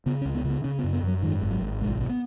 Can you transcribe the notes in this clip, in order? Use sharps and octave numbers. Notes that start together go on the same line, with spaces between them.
C#3 B3
C#4
C#2
B3
C#3
B3
C#3 C#4
B3
F#2
B3
F#2 F#3
G#2 D#3
G#1
F#3
G#1
B1 G#3
B2
B3